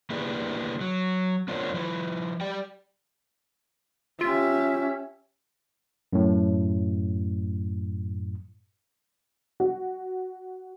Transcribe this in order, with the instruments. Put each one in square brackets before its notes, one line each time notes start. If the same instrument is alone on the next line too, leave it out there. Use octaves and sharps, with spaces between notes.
[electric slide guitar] A#3 D4 E4 G4 G#4 B4
F#3
B3 D4 F4 A#4 C5 C#5
F3 E4
G4 D5 G5
[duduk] C#4 [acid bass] F4 [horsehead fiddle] G4 E5
[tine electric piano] F#2 A2
[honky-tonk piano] F#4